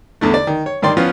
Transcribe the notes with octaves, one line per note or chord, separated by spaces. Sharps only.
E2 D3 A3
D5
D#3
C#5
G2 D#3 D5 C6
F3 B3 C#4 F4